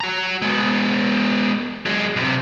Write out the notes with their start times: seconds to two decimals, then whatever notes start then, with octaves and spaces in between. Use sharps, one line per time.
0.01 F#4 A#5
0.42 G#3 B3
1.86 F#3 G#3
2.16 B1 C3